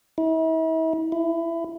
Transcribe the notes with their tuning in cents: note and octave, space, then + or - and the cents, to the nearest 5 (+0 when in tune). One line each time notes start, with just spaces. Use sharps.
E4 -40
E4 +20